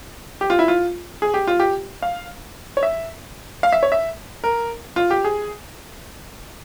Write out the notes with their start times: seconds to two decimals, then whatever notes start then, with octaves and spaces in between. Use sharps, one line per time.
0.41 G4
0.50 F4
0.59 E4
0.68 F4
1.22 G#4
1.34 G4
1.47 F4
1.60 G4
2.02 F5
2.77 C#5
2.83 E5
3.63 F5
3.72 E5
3.83 C#5
3.92 E5
4.44 A#4
4.96 F4
5.11 G4
5.25 G#4